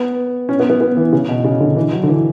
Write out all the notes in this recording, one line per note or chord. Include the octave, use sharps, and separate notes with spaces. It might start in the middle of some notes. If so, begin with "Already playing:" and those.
Already playing: B3
C#4
B3
B3
B3
E3
C#3
B2
C#3
D3
E3
F#3
D3
E3